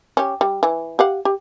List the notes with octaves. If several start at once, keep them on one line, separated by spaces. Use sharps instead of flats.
C#4 G4
G3
E3
G4 F5 F#5
G4